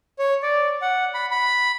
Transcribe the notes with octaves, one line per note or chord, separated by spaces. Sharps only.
C#5
D5
F#5
B5
B5